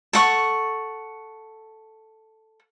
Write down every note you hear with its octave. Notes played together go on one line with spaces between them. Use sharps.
A4 F#5 C#6